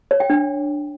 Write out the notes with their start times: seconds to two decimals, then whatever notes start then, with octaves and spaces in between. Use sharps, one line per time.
0.11 C#5
0.20 G5
0.30 D4